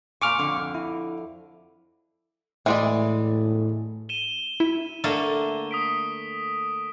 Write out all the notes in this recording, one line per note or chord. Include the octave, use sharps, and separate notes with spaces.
A#2 G#5 C#6 D6 F6
F2 D3
E4
A2 E3 G#3 D5
D#7 E7 G7
E4
D3 A3 A#3
D#6 B6 D7